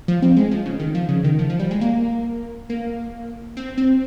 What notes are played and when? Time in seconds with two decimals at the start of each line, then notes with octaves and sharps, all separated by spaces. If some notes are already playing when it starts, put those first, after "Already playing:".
0.08 F3
0.22 C4
0.37 G#3
0.51 F3
0.66 C#3
0.80 D#3
0.95 F3
1.09 C#3
1.24 D#3
1.39 F3
1.50 F3
1.59 G3
1.71 G#3
1.81 A#3
2.70 A#3
3.57 C4
3.78 C4